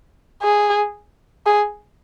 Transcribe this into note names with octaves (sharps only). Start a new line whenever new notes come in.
G#4
G#4